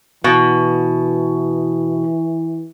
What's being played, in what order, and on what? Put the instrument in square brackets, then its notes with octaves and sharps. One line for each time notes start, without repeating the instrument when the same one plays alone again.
[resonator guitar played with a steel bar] B2 [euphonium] E3